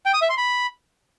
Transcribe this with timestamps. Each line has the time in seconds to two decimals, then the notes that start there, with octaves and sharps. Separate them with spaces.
0.06 G5
0.14 D#6
0.22 E5
0.29 C6
0.37 B5